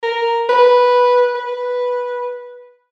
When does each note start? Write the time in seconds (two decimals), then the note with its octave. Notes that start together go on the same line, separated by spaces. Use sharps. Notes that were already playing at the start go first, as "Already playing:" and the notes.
0.03 A#4
0.49 B4
1.35 B4